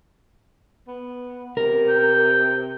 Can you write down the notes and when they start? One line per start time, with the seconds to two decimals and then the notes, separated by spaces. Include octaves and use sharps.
0.88 B3
1.57 C3 A#4
1.88 G5